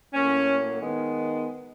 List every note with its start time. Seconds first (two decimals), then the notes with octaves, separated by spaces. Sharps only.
0.13 A2 F#3 A#3 C#4
0.82 D#3 G#3 B3